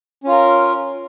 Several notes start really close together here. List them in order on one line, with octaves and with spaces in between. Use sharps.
C#4 F4 A#4